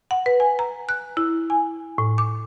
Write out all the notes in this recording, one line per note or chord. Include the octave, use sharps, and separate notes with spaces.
F#5
B4
G#5
A#5
F#6
E4
G#5
A2
D6